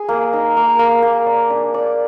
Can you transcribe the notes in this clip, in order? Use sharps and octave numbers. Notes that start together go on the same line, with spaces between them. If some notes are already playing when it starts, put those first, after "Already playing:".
Already playing: G#4
A#3
D#4
A#3
A#3
A#3
D5
D4
D5